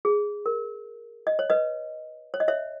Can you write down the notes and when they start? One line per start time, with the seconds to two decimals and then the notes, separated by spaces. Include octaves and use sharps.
0.05 G#4
0.46 A#4
1.27 D#5
1.39 C#5
1.50 B4 D#5
2.34 C#5
2.40 D#5
2.48 C#5 E5